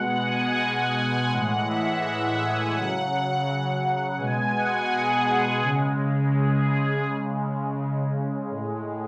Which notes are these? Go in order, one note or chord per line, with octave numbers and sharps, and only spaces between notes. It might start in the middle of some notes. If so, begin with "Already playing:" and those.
Already playing: B2 G#3 F#5
G#5
G#5
A2 E3 G#3 F#5
E5
F#5
G#5
C#3 F#3 F#5
B2 G#3 G#5
F#5
G#4
C#3 G#3
G#4
C#3 G#3
A2 G#3